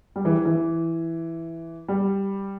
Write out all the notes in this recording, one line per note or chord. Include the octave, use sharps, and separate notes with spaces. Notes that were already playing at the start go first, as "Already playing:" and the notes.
G3
E3
E3
G3